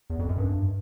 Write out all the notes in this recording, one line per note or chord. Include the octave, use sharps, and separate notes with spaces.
E2
F2
F#2
G2